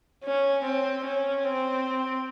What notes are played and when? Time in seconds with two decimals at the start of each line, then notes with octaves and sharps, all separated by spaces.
0.24 C#4
0.65 C4
1.05 C#4
1.44 C4